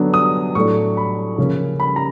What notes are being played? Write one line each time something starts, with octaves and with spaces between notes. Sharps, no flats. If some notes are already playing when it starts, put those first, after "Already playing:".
Already playing: D3 F#3 B3 D4
D#6
A2 F#3 A3 D4 C#6
B5
C#3 F3 A#3 C#4
B5
A#5